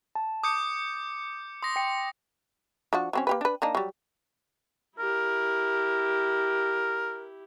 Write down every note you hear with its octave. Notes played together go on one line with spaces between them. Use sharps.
A5
D6 D#6 G6 C#7
C6 D#6 A#6
G5 C#7
F3 D4 F#4
F#3 C4 C#4
A#3 G4 B4
D4 B4
A#3 D4 D#4
F#3 G3
E4 G4 A#4